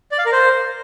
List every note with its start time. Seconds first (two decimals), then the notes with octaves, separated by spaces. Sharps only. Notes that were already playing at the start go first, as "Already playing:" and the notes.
0.12 D5
0.19 F5
0.26 A#4
0.33 C5